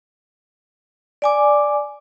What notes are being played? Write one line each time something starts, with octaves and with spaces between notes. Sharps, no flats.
D5 G#5 D6